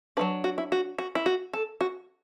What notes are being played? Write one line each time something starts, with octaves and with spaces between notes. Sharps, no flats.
F#3 A3 D4 B4
F#4
E4
F#4
F#4
E4
F#4
A4
F#4